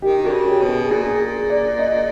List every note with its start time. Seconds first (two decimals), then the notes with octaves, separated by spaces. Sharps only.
0.02 D#3 G4
0.24 D3 F#4
0.31 C#3
0.47 G4
0.61 B2
0.69 G#4
0.90 A#2 G#4
1.20 G#4
1.50 D5
1.79 D#5